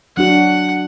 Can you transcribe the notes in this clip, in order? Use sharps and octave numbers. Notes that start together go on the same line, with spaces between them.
F#3 D4 F#4 F#5